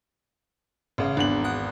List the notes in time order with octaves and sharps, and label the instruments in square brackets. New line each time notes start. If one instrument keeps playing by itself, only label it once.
[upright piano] A1 C#3
[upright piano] G#1 E2 F#7 [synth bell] D4
[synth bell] F#5 D#6 F#6